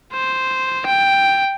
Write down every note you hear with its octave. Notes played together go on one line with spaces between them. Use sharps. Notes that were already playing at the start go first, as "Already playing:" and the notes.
C5
G5